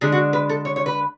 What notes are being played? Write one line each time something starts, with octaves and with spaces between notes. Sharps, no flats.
D3 G#3 D4 G#4
F#4
B4
A4
C#5
C#5
B4